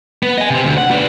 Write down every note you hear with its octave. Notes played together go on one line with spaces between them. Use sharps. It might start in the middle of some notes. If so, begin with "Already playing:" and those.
B3
D#5 G#5
C3 C4
D2
F#5
B3 D4